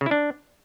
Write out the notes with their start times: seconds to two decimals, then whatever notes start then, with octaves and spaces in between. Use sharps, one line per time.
0.01 C#3
0.06 E4
0.11 D4